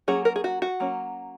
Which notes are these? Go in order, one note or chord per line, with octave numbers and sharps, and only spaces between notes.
F#3 A#3 C#4 G#4
A#4
G#4
F#4
F#4
F#3 A#3 C#4